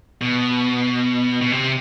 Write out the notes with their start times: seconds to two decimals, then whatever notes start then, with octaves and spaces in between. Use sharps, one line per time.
0.21 B2
1.41 B2
1.52 C3